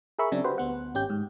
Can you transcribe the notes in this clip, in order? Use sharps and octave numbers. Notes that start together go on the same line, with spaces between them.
G#4 A#4 E5 B5 C#6
C#3 F#3 C4 D4
F#4 G4 B4 C5
D2 B3 F#5
G#1 C#4 G4 G6
G#2